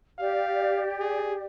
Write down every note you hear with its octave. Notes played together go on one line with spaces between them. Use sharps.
G4 D5 F5
G#4